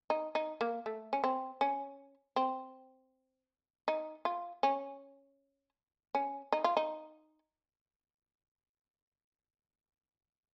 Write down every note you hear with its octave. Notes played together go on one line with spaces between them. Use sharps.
D#4
D#4
A#3
A3
C#4
C4
C#4
C4
D#4
F4
C#4
C#4
D#4
F4
D#4